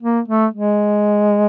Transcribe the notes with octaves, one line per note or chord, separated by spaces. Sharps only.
A#3
A3
G#3